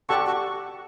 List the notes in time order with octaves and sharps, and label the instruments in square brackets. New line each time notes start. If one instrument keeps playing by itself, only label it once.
[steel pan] G4 D5 F#5 A5 C#6 [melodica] A4
[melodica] F#4